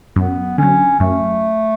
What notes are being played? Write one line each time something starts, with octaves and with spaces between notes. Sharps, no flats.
F#2 B3
D3 F#3 C#4
F#2 A3